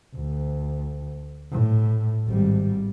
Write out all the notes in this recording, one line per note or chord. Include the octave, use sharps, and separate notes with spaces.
D2
A2
G#1 G3